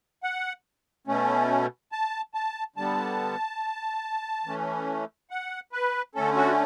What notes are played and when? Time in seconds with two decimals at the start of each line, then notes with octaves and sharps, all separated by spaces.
0.23 F#5
1.07 B2 A3 C#4
1.92 A5
2.34 A5
2.76 D3 G3 B3 A5
4.45 E3 A3 C#4
5.30 F#5
5.73 B4
6.15 D3 A3 C#4 A4
6.36 F#4